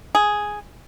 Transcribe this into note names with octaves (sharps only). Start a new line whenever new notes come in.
G#4